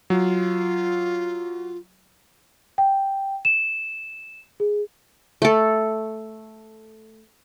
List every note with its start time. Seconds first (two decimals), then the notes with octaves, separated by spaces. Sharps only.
0.10 F#3 F4
2.78 G5
3.45 E7
4.60 G#4
5.42 A3 A4